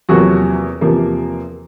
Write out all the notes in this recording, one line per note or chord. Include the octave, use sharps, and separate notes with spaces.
E2 C3 F3 F#3 A#3 F#4
E2 C3 F3 A#3